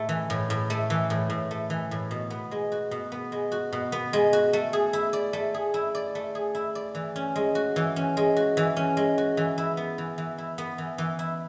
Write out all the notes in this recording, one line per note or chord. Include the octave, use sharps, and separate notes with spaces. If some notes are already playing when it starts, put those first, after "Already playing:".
Already playing: A2 A3
E3
A2
A2
A3
E3
A2
A2
A3
E3
A2
B2
B3
G#3
F#4
B2
B3
G#3
F#4
B2
B3
G#3
F#4
A3
G#4
E4
D5
A3
G#4
E4
D5
A3
G#4
E4
D5
E3
C#4
G#3
F#4
E3
C#4
G#3
F#4
E3
C#4
G#3
F#4
E3
E4
B3
E3
E3
E4
B3
E3
E3
E4